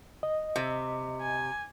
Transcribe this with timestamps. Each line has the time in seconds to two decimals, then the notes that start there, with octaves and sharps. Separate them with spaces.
0.23 D#5
0.56 C3
1.21 G#5